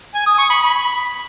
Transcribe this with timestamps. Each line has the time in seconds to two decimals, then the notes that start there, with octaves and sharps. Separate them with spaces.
0.15 G#5
0.27 D#6
0.38 C#6
0.50 B5
0.62 B5